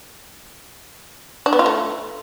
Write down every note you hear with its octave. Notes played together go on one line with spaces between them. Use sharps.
D4
B3
F4
A3